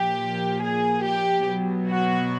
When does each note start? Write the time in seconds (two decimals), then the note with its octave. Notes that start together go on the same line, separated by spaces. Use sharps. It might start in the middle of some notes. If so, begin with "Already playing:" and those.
Already playing: A#2 F3 A#3 G4
0.62 G#4
1.05 G4
1.47 B2 F#3 B3
1.88 F#4